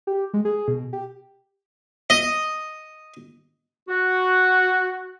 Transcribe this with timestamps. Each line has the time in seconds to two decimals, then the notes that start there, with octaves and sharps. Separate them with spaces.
0.07 G4
0.34 G#3
0.45 G#4
0.68 B2
0.93 G4
2.10 D#5
3.88 F#4